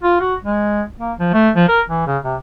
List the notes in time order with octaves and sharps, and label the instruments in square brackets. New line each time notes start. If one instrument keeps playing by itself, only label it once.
[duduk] F4
F#4
G#3
A#3
F3
A3
F3
A#4
E3
C#3
C3